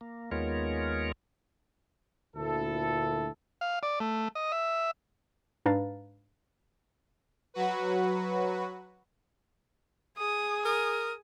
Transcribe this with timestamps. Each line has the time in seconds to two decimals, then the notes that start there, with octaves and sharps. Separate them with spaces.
0.01 A#3
0.32 D#2 G#3 B3 F4 A#4 C#5
2.35 D2 A#2 E4 A4
3.61 F5
3.83 D5
4.00 A3
4.35 D#5
4.52 E5
5.66 G#2 D4 B4 F5 A#5 A6
7.54 F#3 F#4 B4
10.18 G#4 D#6
10.65 A#4 D#6